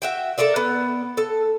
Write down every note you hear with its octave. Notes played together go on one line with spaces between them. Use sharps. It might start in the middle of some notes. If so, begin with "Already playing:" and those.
F#4 E5 G5
A4 A#4 D5 E5
B3
A4